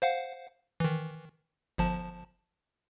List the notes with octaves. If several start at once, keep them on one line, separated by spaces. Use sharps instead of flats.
C5 F5 F#5
D#3 E3
G1 F3 A5